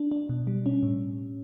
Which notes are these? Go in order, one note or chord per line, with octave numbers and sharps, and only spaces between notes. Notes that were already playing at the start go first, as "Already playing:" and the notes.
Already playing: D4
D4
B2
G3
C#4
A2